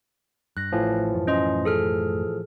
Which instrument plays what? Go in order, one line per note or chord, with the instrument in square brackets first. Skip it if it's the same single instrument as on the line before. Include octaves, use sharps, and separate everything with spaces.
[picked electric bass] G2 [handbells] F#6 A#6
[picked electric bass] A1 [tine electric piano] A2 E3 F3
[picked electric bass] B1 F#2 A3
[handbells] C#4 D#5 C6
G#4 A4 F6